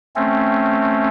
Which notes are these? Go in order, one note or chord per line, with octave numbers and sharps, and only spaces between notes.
A3 C4 C#4